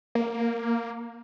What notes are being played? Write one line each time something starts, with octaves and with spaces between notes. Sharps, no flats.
A#3